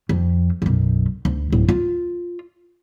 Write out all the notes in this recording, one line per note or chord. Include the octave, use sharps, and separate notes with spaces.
F2
B1 F#2
D2
D1
F4